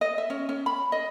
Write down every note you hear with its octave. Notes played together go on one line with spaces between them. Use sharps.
D#5
E5
C#4
C#4
B5
D#5